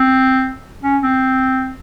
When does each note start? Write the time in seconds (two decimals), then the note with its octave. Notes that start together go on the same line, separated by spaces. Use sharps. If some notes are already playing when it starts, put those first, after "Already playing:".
Already playing: C4
0.83 C#4
1.03 C4